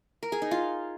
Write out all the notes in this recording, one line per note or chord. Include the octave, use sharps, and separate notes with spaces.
A#4
G#4
D#4
F4